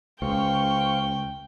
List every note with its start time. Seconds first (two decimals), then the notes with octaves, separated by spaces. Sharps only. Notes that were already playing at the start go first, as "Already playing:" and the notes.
0.22 C#2 C5 F5 G5 C#6